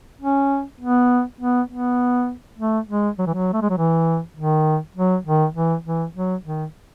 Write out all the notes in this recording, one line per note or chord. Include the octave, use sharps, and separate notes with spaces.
C#4
B3
B3
B3
A3
G#3
F#3
E3
F#3
A3
G#3
F#3
E3
D#3
F#3
D#3
E3
E3
F#3
D#3